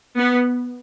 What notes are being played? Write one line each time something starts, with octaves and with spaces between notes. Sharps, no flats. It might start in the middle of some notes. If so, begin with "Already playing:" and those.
B3